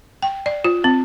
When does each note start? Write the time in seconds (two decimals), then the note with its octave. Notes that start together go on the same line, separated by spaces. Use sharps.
0.22 G5
0.46 D5
0.64 F4
0.84 C4